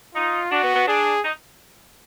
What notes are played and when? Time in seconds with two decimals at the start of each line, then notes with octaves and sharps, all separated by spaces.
0.15 D#4 F4
0.51 D4 F#4
0.63 B3
0.75 B3
0.87 D4 G#4
1.24 D#4